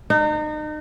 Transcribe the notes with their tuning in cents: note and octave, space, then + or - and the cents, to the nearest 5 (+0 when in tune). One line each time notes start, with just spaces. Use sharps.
D#4 -35